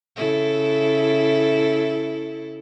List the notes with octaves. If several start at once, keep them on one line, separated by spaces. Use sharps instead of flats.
C#3 E4 A4